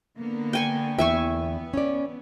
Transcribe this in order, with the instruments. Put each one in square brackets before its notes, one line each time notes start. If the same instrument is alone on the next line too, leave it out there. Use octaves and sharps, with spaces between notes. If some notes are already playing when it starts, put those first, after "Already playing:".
[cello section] D3 A#3 B3
[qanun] G5 G#5 C#6
[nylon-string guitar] E2 E4 G5 [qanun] E5 G#5 C#6
[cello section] B3
[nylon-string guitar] C#4 D5